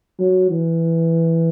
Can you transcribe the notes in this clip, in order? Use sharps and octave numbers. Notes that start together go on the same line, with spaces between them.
F#3
E3